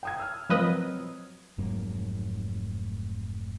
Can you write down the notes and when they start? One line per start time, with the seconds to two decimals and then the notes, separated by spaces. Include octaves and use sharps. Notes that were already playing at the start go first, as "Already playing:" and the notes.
0.03 G5 D#6 G#6
0.20 E6 F6
0.49 F3 F#3 C4 A#4 B4 D#5
1.58 F1 G#2 F#3 A#3